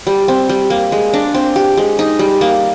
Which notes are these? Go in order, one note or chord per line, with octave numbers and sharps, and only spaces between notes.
G3
C4
G3
A#3
G#3
D4
C4
G4
G#3
D#4
G3
A#3